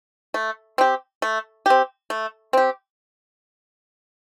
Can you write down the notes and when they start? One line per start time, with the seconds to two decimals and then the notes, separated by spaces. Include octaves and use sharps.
0.34 A3
0.78 C4 G4
1.22 A3
1.66 C4 G4
2.10 A3
2.53 C4 G4